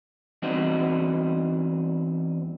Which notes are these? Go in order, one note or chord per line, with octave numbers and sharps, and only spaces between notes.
E2 G3 C4 D4 D#4 F#4